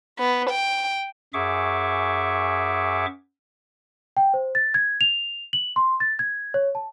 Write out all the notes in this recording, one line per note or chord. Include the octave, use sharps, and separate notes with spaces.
B3
G5
F#2 G#4 E5 C#6 D6
G5
C5
A6
G#6
F7
F#7
C6
A6
G#6
C#5
A5